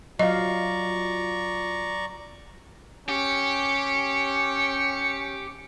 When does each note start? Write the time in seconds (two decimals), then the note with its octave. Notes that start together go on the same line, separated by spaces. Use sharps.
0.19 F#3 F4 D5 D#5 F5 A#5 C#6
3.09 C#4 G4 C#7